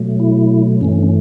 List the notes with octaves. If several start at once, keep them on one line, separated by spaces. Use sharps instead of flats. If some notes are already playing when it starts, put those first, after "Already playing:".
Already playing: B2 F#3 A3
E4
G2 E3 A3 C#4
C#4
C#4